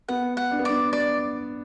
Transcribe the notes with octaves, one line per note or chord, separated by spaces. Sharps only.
B3 F#5
F#5
D4
B3
D4 D5
D5